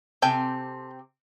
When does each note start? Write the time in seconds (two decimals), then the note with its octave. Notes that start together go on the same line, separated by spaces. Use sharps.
0.22 C3 C4 G4 A4 G5 G#5